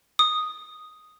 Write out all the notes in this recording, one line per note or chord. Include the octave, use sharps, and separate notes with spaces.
D#6